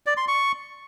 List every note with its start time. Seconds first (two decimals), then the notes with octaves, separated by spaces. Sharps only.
0.06 D5
0.17 C6
0.28 C#6